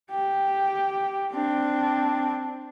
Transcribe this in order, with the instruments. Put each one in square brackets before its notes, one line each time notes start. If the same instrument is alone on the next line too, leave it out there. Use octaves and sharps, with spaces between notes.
[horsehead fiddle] G4
C4 D4